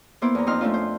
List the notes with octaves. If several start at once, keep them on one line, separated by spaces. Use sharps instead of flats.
A#3 B3 E4 C5 D6
E2 A#5
F2 F3 C4 D#4 C6 F6
A3 C#4 D4 F4
C5